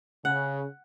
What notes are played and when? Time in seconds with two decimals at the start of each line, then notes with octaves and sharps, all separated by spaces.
0.25 C#3 F#5